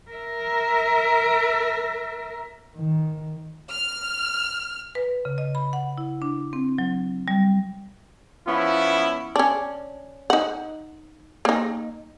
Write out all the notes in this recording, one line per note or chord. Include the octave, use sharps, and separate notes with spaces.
A#4 E5
D#3
F6
B4
C#3
D#5
B5
F#5
E4
D4
C4
F#3
G3
F3 B3 C#4 E4
C#4 D4
D#4 F#5
A#3 D#4